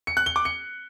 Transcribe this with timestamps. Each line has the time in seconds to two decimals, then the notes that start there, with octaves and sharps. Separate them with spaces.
0.07 C#7
0.17 F#6
0.26 G7
0.36 D6
0.45 C#7